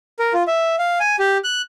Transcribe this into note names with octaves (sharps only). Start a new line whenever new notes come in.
A#4
F4
E5
F5
G#5
G4
F#6